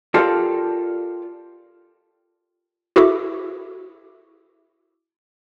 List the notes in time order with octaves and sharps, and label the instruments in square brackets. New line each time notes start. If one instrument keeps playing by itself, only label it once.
[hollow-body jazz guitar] F4 G4 A4 A#4 D5
[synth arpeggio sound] E4 F#4 G#4 A4 E5 D6